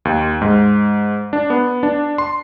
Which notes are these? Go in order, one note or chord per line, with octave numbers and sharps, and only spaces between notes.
D#2
G#2
D4
B3
D4
C6